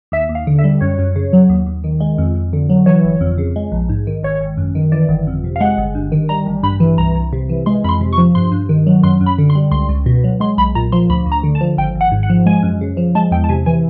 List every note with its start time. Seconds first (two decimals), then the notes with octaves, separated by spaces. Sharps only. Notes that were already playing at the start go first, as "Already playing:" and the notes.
0.12 D#2 E5
0.29 D#2
0.35 F5
0.47 D3
0.59 E5
0.64 G3
0.81 F#2 C#5
0.99 F#2
1.16 C#3
1.33 F#3
1.49 D#2
1.66 D#2
1.84 D#3
2.00 G#3
2.18 F2
2.35 F2
2.53 D3
2.70 F#3
2.86 E3 C#5
3.04 G1
3.21 F2
3.38 C#3
3.56 G#3
3.72 A#1
3.89 G#2
4.07 D#3
4.23 G#1 C#5
4.41 G#1
4.57 F#2
4.75 D#3
4.92 E3 D5
5.09 G1
5.27 F2
5.44 C3
5.56 F5
5.61 G#3 F#5
5.78 G1
5.95 G2
6.12 D#3
6.29 G3 A#5
6.46 A1
6.63 G2 B5
6.80 E3
6.98 C2 A#5
7.15 C2
7.33 C3
7.49 E3
7.66 G#3 C6
7.84 F2 B5
7.89 C6
8.01 C3
8.13 C#6
8.18 F3
8.35 G2 C6
8.52 G2
8.69 D#3
8.87 F#3
9.03 F#2 C6
9.21 F#2
9.26 B5
9.38 D3
9.50 C6
9.55 G3
9.72 C#2 C6
9.89 C#2
10.06 B2
10.24 F#3
10.40 G#3 C6
10.58 B1 B5
10.75 A#2 A#5
10.92 F3 C6
11.09 D2 B5
11.26 D2
11.32 A#5
11.43 D3
11.55 A5
11.61 F3
11.78 G#1 G5
11.95 G#1
12.01 F#5
12.12 G#2
12.23 F#5
12.30 F3
12.46 G#3 G#5
12.63 F#2
12.81 C#3
12.97 F3
13.15 G#3 A5
13.31 E2 G5
13.44 A5
13.49 C3 G#5
13.66 E3 G#5